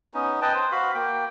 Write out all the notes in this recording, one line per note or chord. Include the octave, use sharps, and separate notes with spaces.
B3 C#4 D#4
B4 D#5 G5 A5
C5
F#4 F5 B5
A#3 G5